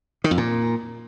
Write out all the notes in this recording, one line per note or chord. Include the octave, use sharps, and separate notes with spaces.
D#3
F2
A#2